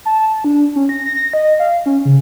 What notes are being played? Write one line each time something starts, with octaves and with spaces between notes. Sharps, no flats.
A5
D4
C#4
A#6
A#6
D#5
F5
C#4
C#3